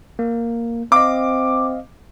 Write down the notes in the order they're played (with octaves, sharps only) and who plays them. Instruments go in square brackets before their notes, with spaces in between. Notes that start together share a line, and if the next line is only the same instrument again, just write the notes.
[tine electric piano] A#3
[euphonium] C4 [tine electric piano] D#5 F5 [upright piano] D6